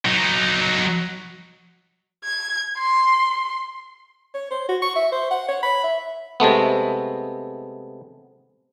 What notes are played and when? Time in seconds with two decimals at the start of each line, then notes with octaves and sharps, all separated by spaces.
0.05 F#3 D#4
2.24 G#6
2.79 C6
4.35 C#5
4.51 C5
4.69 F#4
4.82 C#6
4.96 E5
5.12 C5
5.31 F#5
5.49 C#5
5.63 B5
5.84 E5
6.40 C3 G#3 A3 B3